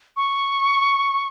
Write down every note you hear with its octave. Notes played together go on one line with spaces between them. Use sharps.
C#6